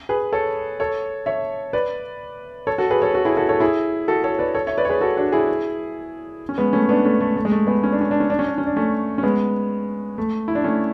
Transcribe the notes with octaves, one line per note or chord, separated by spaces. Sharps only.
G#4 B4
A4 C#5
A4 C#5
C#5 E5
B4 D5
A4 C#5
F#4 A4
G#4 B4
A4 C#5
F#4 A4
E4 G#4
F#4 A4
A4 C#5
E4 G#4
F#4 A4
A4 C#5
B4 D5
A4 C#5
C#5 E5
B4 D5
C#5
G#4 B4
F#4 A4
D4 F#4
E4 G#4
C#4
G#3 B3
A3 C#4
B3 D4
A3 C#4
A3
A3
G#3
A3
G#3 B3
C#4
D4
C#4
D4
C#4
D4
C#4
D4
C#4
D4
A3 C#4
C#4
G#3 B3
A3
E4
D4
A3 C#4